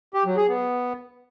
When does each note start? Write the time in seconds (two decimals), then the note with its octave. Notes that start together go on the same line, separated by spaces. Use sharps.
0.14 G4
0.25 F#3
0.37 G#4
0.48 B3